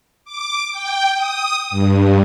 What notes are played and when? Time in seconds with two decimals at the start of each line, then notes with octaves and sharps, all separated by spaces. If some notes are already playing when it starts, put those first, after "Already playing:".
0.25 D6
0.72 G5
1.15 D#6
1.70 G2